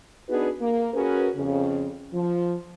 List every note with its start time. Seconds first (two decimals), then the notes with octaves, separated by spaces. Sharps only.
0.29 B3 D4 D#4 F#4 G#4 B4
0.60 A#3
0.94 C#4 F#4 G#4 A#4 B4
1.36 F2 C#3
2.13 F3